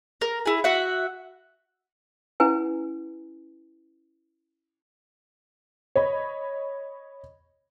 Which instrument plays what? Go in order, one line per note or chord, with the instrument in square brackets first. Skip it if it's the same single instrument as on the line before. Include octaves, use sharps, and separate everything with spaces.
[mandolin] A#4
E4 G#4
F#4 E5 F#5
[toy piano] C#4 E4 B4 G#5
[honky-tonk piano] C#5 D#5 B5